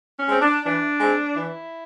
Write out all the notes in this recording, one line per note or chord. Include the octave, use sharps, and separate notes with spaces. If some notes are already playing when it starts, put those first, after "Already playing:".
C#4
G#3 C4
D4
E3 D4
G#3 C4
E3 E4